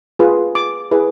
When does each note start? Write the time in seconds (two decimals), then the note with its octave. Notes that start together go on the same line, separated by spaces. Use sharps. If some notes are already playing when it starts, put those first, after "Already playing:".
0.19 F4 G#4 B4
0.55 D6
0.91 E4 G#4 B4